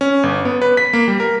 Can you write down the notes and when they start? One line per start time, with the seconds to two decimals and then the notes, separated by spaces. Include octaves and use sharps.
0.01 C#4
0.23 G1
0.45 B3
0.62 B4
0.77 B6
0.93 A#3
1.08 G3
1.20 A#4